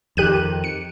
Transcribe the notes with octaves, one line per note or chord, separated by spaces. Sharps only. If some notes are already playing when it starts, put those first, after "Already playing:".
F2 D#3 G4 F#6 D#7
C#7